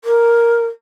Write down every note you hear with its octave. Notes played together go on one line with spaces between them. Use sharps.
A#4